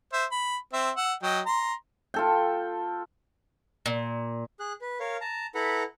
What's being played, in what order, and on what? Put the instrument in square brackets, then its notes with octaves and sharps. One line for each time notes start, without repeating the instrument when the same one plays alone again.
[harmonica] C5 E5
B5
C4 E5 C6
F#5 E6
F#3 D#5 G5
A#5 C6
[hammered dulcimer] F4 A4 G5
[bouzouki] A#2
[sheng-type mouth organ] G#4 F#6
B4
A#4 C#5 F5
A5 A#5
E4 A4 B4 F#5 A#5 B5